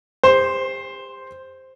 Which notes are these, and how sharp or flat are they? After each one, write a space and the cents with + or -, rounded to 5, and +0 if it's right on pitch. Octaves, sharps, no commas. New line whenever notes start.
G4 +40 C5 +0